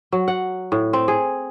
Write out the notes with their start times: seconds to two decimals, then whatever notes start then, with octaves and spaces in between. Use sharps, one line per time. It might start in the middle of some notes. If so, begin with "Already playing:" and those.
0.12 F#3
0.28 F#5
0.72 A2
0.93 C4
1.08 G#4